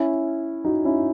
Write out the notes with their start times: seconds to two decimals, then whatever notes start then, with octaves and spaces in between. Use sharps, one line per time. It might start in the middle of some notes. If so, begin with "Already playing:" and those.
Already playing: C#4 E4
0.65 D#4 F#4
0.85 C#4 E4